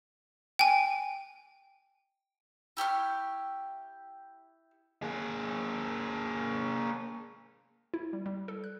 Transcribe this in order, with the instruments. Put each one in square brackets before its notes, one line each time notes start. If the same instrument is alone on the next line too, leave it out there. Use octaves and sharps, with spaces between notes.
[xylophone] G5 G#5
[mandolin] E4 G4 C#6 F6
[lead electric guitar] A#3 G#4
[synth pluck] E4
G3
G3
A4
F#6